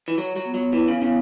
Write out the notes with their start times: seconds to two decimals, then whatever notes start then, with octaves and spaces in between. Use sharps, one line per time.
0.08 E3
0.18 F#3 C#5
0.36 F#3
0.45 B3
0.54 F#3
0.73 E3 E4
0.88 C#3
1.01 C#3 B3